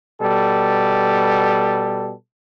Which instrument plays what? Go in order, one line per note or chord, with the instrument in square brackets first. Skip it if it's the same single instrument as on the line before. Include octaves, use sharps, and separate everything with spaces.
[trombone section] B2 G3 A4